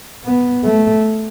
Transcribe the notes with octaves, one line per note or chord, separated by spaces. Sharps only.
B3
A3